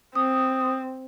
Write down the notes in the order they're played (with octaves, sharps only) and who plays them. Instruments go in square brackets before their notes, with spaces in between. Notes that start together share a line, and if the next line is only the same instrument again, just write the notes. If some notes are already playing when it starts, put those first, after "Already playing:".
[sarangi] C4 [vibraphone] D#6